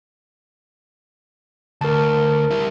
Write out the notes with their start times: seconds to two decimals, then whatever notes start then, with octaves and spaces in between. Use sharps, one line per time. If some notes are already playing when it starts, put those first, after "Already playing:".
1.81 D2 A#4 A5
2.51 G3 E4